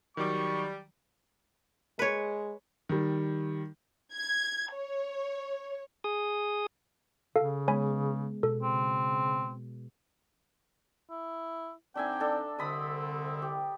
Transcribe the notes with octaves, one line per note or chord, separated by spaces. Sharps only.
D#3 F#3 G3 C#6 D6
G#3 B4 C#5
D#3 G3
G#6
C#5
G#4 D#6
C#3 A4 F5
G#3 B3 C#5 G#5 B5
B2 A4
C#3 C4
E4
D3 C4 D4 D#4 E5 G5 G#5
D4 A4
C2 D3 C4 D#5 B5 D#6
G4